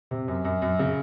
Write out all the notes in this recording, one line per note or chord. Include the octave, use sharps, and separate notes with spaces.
C3
F#2
F#2
F#2
C#3